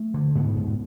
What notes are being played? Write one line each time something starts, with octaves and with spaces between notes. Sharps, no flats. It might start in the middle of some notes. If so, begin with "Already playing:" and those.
Already playing: A3
D3
G#2 B3
G#2